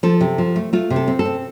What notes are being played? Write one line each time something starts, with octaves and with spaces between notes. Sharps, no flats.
F3 A4
C3
F3
A3
A3 F4
C3
A4
C4
A4
C4